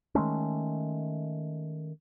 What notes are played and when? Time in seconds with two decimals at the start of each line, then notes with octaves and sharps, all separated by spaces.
0.15 D#3 G#3 A3 C#4